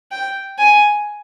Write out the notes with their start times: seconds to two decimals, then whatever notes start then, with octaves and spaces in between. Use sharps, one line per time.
0.11 G5
0.58 G#5